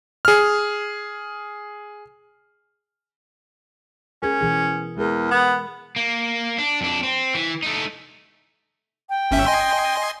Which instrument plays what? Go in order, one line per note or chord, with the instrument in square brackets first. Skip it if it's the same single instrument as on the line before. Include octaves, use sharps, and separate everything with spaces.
[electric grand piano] G#4 F6
[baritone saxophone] C#4 [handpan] G#4 A#4
[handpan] B2 E3 G#4
[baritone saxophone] E2 [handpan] G#3 G#4 A#4
[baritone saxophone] B3
[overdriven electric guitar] A#3
D4
F2 D4
C4
E3
A3 D#4
[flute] G5
[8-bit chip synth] G1 C#4 E5
D#5 G#5 C6